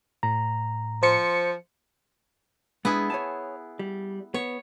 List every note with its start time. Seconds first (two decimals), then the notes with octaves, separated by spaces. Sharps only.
0.23 A2 A#5
1.03 F3 C5 C#7
2.85 G#3 B3 D4 E4 G#4
3.10 C#5 G#5 A5
3.79 G3
4.34 B3 C#5